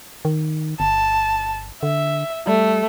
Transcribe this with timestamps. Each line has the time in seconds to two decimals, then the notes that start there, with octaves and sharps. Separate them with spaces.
0.25 D#3
0.80 G1 A5
1.83 D3 E5
2.47 G3 A3